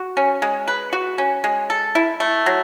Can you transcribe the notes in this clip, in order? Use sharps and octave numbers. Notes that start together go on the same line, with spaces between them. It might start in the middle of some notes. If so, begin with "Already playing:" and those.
Already playing: F#4
C#4
G#3
B4
F#4
C#4
G#3
A4
E4
A3
F#3